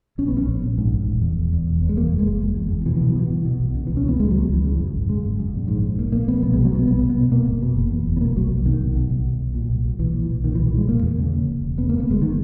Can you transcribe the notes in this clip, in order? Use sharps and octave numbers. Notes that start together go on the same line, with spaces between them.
A#1 C#4
B3
A#1 C#4
A#1
A#1
G#2
A#1
E1
E2
E1
E2
E1
E2
G#3
F#1 A#3
F#1
G#3
F#1
F#1
E2
E2
B2 E3
E3
B2
F#3
B2 E3
B2
B2
B1
C#3
E3
C#2
C#4
C#3 B3
C#2 G#3
F#3
C#2
C#2 E3
C#3
F#2
G#1
C#3 G#3
G#1
F#2
A#1
G#2
A#1
A#1 A#3
A#1 A#3
A#1 B3
B1 B3
G#3
B2
F#3
B1 B3
B1 B3
B2
B3
B2
B2 A#3
F#1
B2
F#1
E2
F#1
B3
B2 A#3
B1 F#3
B1
B2 D#3
B1
B2
B1
B1
B1
A#2
B1
B1
B1 E3
A#2
B1
A#2 D#3
E3
B1
F#3
A#2 G#3
E1 A#3
E2
C#3
C#3
E1
E1
C#3 B3
A#3
F#1
B3
F#1 G#3
D#3